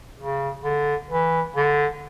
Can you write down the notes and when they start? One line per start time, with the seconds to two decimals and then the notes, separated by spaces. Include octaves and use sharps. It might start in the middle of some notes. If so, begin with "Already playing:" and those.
0.18 C#3
0.64 D3
1.10 E3
1.56 D3